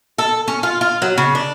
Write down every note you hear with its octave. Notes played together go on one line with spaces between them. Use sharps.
A4
C#4
F4
F4
F#3
C#3
D4